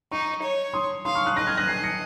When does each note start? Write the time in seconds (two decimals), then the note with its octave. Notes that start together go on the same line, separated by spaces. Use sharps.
0.11 D#4 A#5 C#6
0.42 C#5
0.73 C6 D#6
1.05 F5 C6 D#6
1.15 C#6 F6
1.26 D#6 F#6
1.37 D#5 F#6 A#6
1.47 F6 G#6
1.57 F#6 A#6
1.67 G#6 C7
1.83 A#6 C#7